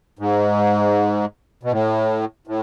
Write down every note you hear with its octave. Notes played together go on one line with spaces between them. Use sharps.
G#2
B2
A2
A2